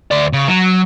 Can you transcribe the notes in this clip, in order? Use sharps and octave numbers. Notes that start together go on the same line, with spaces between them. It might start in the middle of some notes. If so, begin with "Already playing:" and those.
D2 D5
C#3
F#3